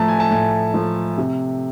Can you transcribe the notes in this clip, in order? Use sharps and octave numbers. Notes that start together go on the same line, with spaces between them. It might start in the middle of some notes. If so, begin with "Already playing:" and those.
Already playing: A2 F3 A3 A5 A#5
G#5
A5
A2 G#5
F3 A3
C3